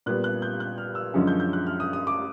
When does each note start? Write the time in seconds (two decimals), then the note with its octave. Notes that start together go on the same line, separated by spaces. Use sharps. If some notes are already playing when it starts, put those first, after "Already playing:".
0.06 A#2 G3 B3 F#6
0.24 F#6
0.42 G6
0.60 F#6
0.78 F6
0.95 E6
1.14 F#2 D3 F3 G#3 C#4
1.27 G6
1.40 G6
1.53 F#6
1.67 F6
1.80 D#6
1.93 D#6
2.07 D6